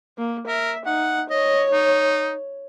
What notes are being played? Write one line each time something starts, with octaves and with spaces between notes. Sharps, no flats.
A#3
A#4 E5
D#4 F#5
C#5 D#5
D#4